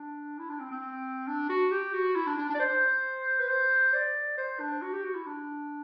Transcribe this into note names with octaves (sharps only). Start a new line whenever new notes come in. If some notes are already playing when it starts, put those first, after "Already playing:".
Already playing: D4
E4
D4
C4
C4
D4
F#4
G4
F#4
E4
D4
D4
D4
D5
C5
B4
C5
D5
C5
D4
F#4
G4
F#4
E4
D4